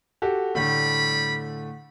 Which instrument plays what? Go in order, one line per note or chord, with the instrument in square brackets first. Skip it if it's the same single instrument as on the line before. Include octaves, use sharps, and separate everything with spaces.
[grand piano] F#4 G4 A4
[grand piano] A2 D3 A3 [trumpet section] G3 B5